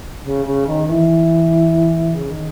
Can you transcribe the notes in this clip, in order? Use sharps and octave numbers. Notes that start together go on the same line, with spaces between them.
C#3
C#3
D#3
E3
C#3
D#3